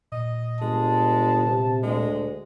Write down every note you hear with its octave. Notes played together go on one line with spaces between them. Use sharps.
A#2 D#5
G1 G#3 A5
C3
D2 G#3